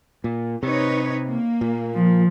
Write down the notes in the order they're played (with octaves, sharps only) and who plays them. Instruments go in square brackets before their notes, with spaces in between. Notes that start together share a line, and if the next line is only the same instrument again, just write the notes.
[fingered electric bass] A#2
[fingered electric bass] C3 [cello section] D#4 B4 C#5
[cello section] A#3
[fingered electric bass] A#2
[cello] F3